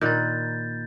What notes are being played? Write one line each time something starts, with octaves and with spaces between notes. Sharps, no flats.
A#2 D#3 B4 G6 A6